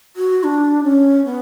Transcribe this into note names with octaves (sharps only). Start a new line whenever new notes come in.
F#4
D4
C#4
B3